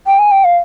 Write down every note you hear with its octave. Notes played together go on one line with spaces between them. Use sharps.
G5
G#5
G5
F5